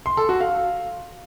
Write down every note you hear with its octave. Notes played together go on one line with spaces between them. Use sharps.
C6
A4
F#4
F5